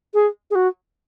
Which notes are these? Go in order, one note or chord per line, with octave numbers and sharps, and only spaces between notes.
G#4
G#4
F#4